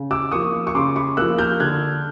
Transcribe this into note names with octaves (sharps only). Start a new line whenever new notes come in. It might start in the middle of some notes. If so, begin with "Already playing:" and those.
Already playing: C#3
D6 E6
F3 A#3 C#6 D#6
C#6
C#3 C6 D6
B5 C#6
F3 A#3 E6 F#6
F6 G6
D3 F#6 G#6